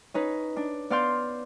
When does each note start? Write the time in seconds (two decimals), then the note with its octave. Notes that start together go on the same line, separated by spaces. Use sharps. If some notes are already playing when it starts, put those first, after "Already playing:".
0.14 C#4 D#4 B4
0.57 D4
0.90 B3 D5 F5 C6 G6